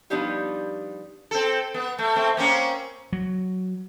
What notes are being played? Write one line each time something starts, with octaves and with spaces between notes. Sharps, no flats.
F3 G3 B3 D4 D#4 G4
C4 A4
B3
A3
A3 C4
A#3 C4 C#4
F#3